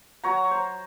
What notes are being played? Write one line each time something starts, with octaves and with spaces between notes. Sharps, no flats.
F#3 C#5 A#5
C5